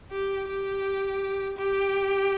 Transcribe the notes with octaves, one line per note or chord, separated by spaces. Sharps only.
G4
G4
G4